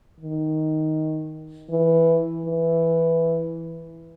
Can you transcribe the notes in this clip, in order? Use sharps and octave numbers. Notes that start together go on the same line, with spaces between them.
D#3
E3
E3